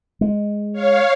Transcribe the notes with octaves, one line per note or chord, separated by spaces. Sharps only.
G#3
C#5 F5